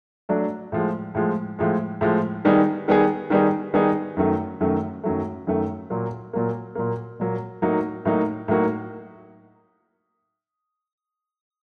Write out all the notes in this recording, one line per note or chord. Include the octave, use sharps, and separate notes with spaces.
F#3 A3 D4
A2 F3 G#3
A2 F3 G#3
A2 F3 G#3
A2 F3 G#3
D#3 G3 B3 D#4 G#4
D#3 G3 B3 D#4 G#4
D#3 G3 B3 D#4 G#4
D#3 G3 B3 D#4 G#4
F#2 D#3 F#3 A3
F#2 D#3 F#3 A3
F#2 D#3 F#3 A3
F#2 D#3 F#3 A3
A#2 F#3 A#3
A#2 F#3 A#3
A#2 F#3 A#3
A#2 F#3 A#3
A2 F#3 A#3 D#4 F#4
A2 F#3 A#3 D#4 F#4
A2 F#3 A#3 D#4 F#4